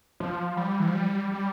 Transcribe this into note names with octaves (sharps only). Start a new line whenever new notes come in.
F3
G3
E3
F3
G3
G3